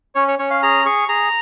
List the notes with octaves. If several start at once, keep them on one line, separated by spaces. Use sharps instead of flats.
C#4 C#5
C#5
C#4 C#5
F5
G#4 A#5
G#4 C#6
G#4 A#5